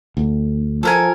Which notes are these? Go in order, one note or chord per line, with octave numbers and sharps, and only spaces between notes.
D2
F3 A4 A#4 G#5